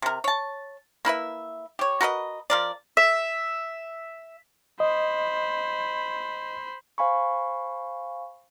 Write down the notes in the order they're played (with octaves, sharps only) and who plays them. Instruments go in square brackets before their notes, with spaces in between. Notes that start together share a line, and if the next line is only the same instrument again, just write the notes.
[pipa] C3 A#4
C#5 A5
A#3 E4 B4 E5
G4 C#5
F#4 A#4 B4 D#5
F3 A#4 D5
[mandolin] E5
[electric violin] C5 B5 [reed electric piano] D#5
[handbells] C5 F5 G#5 B5 C#6